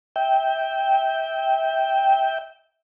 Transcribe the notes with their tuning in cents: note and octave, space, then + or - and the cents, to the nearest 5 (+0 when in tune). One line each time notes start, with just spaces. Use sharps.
E5 -25 G5 +0